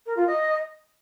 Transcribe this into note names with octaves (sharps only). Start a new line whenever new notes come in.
A#4
F4
D#5